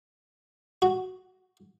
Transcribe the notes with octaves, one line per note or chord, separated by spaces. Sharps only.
F#4